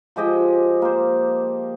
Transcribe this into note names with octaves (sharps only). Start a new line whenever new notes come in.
F3 G#3 G4 D#5
A#3 C5